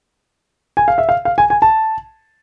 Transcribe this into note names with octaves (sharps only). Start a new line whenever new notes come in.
G#5
F5
E5
F5
F5
G#5
G#5
A5